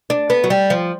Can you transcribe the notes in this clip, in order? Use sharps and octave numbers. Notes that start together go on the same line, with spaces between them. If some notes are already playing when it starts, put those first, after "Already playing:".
D4
B3
F#3
G3
F3